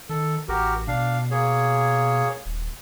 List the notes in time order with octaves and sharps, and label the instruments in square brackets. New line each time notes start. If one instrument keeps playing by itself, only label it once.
[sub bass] D#3 [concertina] A4
[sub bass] A1 [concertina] F#4 G4 A#4
[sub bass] B2 [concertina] D4 F5
[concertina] A#3 G#4 C#5
[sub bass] D#1